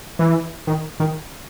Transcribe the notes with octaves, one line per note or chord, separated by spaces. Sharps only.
E3
D#3
D#3